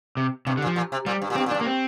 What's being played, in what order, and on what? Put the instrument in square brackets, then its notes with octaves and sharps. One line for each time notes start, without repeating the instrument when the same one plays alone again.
[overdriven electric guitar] C3
[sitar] G2 [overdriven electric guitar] C3
[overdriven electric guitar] D3
[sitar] A#2
[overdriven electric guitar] F3
[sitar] A#2
C3
[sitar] A#2 [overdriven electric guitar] G3
[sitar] G2
A#2
[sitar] G2 [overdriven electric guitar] C4
[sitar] A#2
[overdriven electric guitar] D4
[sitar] G2
[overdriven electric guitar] A#3
C4